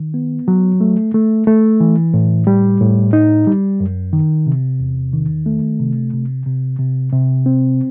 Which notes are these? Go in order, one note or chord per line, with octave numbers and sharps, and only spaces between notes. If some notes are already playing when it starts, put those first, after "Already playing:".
Already playing: D#3
B3
F#3
A3
A3
A3
E3
A2
G3
A2
D#4
G3
F#2
D#3
C3
E2
D#3
A3
C3
C3
C3
C3
C3
C4